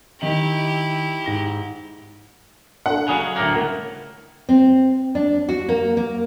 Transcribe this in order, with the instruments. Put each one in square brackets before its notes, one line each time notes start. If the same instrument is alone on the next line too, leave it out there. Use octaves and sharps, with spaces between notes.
[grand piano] D#3 D#5 F#7 [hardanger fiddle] E4 G4
[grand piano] G#2 A#6 G7
[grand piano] D4 A4 [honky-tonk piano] F#5
[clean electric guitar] C#3 F#3 [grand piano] G#5 D#6
[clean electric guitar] D2 A2 A#3
[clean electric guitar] C#2 [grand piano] A#4
[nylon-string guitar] C4
D4
F#4
A#3
A#3